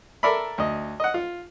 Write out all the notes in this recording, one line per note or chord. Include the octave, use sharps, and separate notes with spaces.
A4 A#4 D5 E5 B5
D2 D#5
D#5 F#5
F4